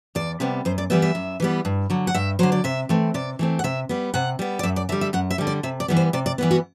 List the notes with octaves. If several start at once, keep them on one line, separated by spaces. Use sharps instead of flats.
E2 D5
C3 G3 B3
F#2 C5
D5
E3 G3 B3 E5
E5
F#2
E3 G3 B3
G2
D3 F#3
F#5
G2 E5
D3 F#3 C5
D5
C3 E5
E3 A3 C4
C3 D5
E3 A3 C4
F#5
C3 E5
G3 B3
C3 F#5
G3 B3
D5
F#2 E5
D5
D3 G3 E5
E5
F#2 F#5
E5
D3 G3
D5
C3 E5
D5
E3 G3 B3
C5
C3 D5
D5
E3 G3 B3
F#4